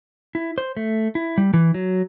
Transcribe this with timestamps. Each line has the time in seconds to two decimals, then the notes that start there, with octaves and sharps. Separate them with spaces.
0.35 E4
0.58 C5
0.77 A3
1.15 E4
1.38 G3
1.54 E3
1.74 F#3